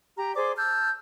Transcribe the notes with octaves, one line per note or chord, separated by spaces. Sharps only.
G4 A#5
G#4 C5 D5 D6
A5 E6 F6 G6